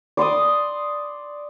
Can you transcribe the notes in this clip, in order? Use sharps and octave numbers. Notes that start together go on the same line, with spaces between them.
D5 C6 D6 D#6